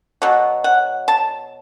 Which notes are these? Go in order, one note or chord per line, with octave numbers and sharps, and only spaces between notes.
B2 F#3
F#5
A5